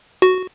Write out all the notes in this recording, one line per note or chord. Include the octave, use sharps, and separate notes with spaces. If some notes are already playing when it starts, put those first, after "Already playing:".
F#4